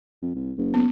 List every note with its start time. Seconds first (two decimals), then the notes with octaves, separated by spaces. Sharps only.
0.22 F2
0.35 C2
0.58 F#1
0.74 B3